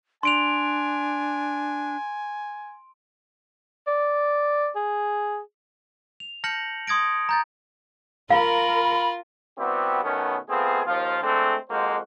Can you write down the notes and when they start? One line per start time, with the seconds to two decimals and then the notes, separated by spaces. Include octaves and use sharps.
0.23 D4 G#5 C6 D7 F7
3.87 D5
4.76 G#4
6.20 F7
6.44 A5 F6 G6 A#6 C#7 F#7
6.87 C6 D#6 G#6 A#6 D7
7.29 A#5 G6 A6
8.30 F4 A#4 F5 B5
9.58 G3 B3 C4 E4 F#4 G4
10.04 B2 D#3 A3 B3 C#4
10.49 A3 B3 C4 F4 G#4
10.86 D#2 F3 F4
11.23 G#3 A3 C4 D4 A4
11.70 F2 G#3 A#3 F#4 C5